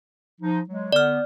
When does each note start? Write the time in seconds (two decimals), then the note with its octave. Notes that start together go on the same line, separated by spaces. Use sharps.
0.41 F3 D#4
0.68 F#3 G#3
0.92 D3 B3 D5 F6